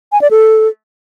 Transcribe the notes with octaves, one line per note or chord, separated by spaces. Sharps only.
G#5
D5
A4